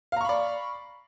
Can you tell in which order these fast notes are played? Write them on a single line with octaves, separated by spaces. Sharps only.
F5 A#5 C#6 B5 D5